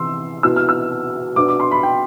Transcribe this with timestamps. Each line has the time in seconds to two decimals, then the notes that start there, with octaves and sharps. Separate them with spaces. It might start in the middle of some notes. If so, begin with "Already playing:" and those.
Already playing: C3 E3 B3 C6 E6
0.43 B2 B3 E4 E6
0.56 F6
0.69 E6
1.36 B2 B3 D4 D6
1.48 D6
1.60 C6
1.71 B5
1.83 G5